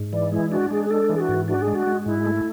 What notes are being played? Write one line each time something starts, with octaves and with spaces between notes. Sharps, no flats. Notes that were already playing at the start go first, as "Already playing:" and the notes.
Already playing: G#2
E3 D5
G#3 E4
D4 F#4
G#3 G#4
G#4
D4 A4
E3 G#4
F#4
G#2
D4 F#4
G#4
G#3
F#4
G#3
G#2 E4
A3